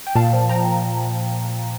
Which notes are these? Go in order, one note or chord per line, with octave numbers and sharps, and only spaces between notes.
G5
A#2 F5 A5
F3
F3 G5 A#5
A#2